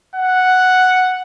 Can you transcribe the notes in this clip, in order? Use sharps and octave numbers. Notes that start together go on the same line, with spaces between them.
F#5